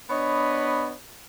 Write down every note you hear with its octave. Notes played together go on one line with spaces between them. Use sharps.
B3 D4 C#5 D#5 B5